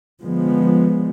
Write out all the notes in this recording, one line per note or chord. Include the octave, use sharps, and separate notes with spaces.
D3 F3 G#3 B3